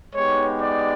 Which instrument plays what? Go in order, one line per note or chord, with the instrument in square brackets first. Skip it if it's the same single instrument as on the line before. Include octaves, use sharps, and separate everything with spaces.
[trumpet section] G#3 B3 D#4 G4 C#5
D5